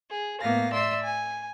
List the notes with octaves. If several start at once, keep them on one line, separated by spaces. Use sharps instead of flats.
G#4
A2 A#3 B3 F5 A#6
D5 E5 C6 E6
G#5